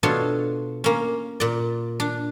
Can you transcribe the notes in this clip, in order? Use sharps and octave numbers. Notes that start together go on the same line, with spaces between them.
B2 D4 F4 A4 C#5
A#3 C#4
A#2 D5
D4